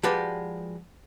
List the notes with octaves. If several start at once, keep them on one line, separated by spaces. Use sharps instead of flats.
F3 G#3 F#4 G4 B4 D5